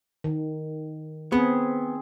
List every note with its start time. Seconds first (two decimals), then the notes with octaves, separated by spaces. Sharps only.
0.24 D#3
1.32 B3 C4 G#4